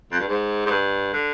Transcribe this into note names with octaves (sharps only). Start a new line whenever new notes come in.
F2
G2
G#2
G#2
G2
D3